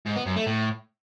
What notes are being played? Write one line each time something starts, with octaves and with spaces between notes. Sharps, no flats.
G#2
B3
F#2
A3
A2